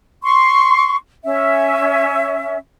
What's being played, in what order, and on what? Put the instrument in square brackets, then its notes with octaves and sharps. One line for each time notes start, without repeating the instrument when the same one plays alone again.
[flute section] C6 C#6
C#4 E5